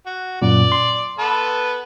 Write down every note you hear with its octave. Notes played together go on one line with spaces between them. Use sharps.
F#4
F#2 A#2 D5
C6
B3 A4 B4